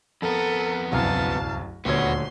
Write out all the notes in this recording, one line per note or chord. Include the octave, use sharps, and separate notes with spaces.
F2 B3 A4 A#4
D1 C2 F#2 F5 A5
D#1 D2 B3 F#4 C#5 C6